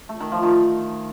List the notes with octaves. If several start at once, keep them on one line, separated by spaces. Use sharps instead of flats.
A3
D#3
F3
D#3